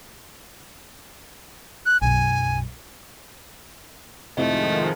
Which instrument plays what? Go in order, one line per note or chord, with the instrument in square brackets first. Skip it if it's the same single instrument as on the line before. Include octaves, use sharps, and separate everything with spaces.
[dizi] F#6
[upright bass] B1 F#2 [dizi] G#5
[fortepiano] F2 A2 C3 [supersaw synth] D#3 F3 G#3 [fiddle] A3 [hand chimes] D#5